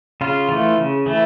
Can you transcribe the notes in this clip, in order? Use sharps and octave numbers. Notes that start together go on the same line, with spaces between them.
C#3 F4
E3 A3
C#3
E3 A3